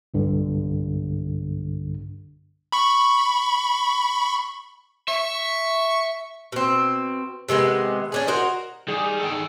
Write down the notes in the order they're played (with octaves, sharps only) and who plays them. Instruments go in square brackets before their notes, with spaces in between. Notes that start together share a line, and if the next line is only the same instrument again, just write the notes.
[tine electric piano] B1 G2 D3
[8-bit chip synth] B5 C#6
[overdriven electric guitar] E5 [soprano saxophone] C#6
[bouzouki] B2 C4
C3 D#3 G#3 B3
C#4 D4 G#4
F#4 A#4 C5 D#5
[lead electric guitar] D#3 [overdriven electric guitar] G3 [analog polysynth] G#4
[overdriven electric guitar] A4 G5